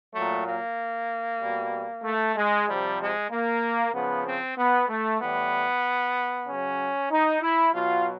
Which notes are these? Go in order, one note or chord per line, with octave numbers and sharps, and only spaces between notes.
A#2 F#3 A3
A#3
B2 G3
A3
G#3
C3 F3 G3
G#3
A#3
C#3 F3 B3
C4
B3
A3
A2 E3 G3 B3
C#3 F#3 C#4
D#4
E4
B2 F#3 F4